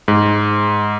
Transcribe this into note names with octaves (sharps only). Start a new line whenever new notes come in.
G#2